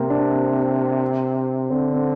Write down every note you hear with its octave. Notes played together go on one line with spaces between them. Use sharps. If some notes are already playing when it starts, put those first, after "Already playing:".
Already playing: C3 A#3 C4
D4
D3 C4
C4